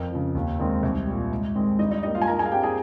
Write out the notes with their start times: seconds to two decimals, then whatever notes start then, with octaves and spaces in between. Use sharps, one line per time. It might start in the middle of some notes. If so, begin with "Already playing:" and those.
Already playing: F2 A#4
0.11 C#3 F3
0.35 D#2
0.59 D#3 G#3 C4
0.83 C2
1.07 A#2 G3
1.31 G#2
1.55 D#3 G#3 C4
1.79 G2 D#4 D#5
1.91 D#4 D#5
2.03 G3 A#3 D#4 D#5
2.15 F4 F5
2.22 G#5
2.27 G2 A#4 A#5
2.39 G#4 G#5
2.46 F5
2.52 G3 C4 G4 G5
2.63 G#4 G#5